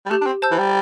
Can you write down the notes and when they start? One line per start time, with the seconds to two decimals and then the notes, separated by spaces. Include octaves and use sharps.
0.06 G3
0.10 A3 G4
0.22 D4
0.26 C4
0.42 C5 A5 E6 G6
0.51 E3
0.59 G3